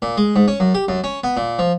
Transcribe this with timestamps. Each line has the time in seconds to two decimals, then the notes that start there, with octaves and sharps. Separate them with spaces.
0.02 A#2
0.17 G#3
0.36 G#2
0.48 C#4
0.60 F#2
0.74 G4
0.88 F#2
1.04 C#4
1.24 B3
1.37 A#2
1.59 F3